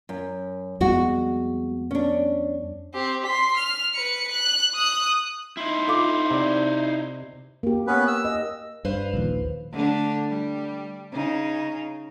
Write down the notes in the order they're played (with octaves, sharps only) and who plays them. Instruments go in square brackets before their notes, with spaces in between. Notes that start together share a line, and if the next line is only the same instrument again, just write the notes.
[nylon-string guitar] F#2
[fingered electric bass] F2 G3 B3 [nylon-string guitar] G#3 F#4
[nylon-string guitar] C#4 D4
[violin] C4 G4
C6 B6
F6
B4 C#7
F#6
D#6 F#6
[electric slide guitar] D#4 E4 [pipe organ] C6
[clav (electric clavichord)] F4 [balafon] A4 D6
[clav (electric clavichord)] C3 D5
[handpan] A#3 G4
[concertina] B3 C#4 B4
E6
[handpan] D#5
[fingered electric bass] G2 [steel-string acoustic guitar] B4 C5 F5
[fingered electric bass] A#1 D#2
[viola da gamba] D3 A3 D4
G3
C#3 D#4